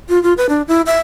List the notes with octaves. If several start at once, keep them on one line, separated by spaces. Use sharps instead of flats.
F4
F4
B4
D4
E4
E5